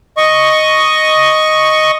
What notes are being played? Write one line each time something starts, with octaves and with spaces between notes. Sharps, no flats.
D#5 C#6